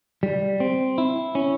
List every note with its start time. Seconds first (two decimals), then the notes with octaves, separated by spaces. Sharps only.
0.23 G3
0.60 C4
0.98 E4
1.35 C#4